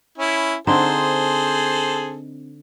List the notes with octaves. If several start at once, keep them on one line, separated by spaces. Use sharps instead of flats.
C#4 E4
D3 C4 D#4 G#4 A4 C5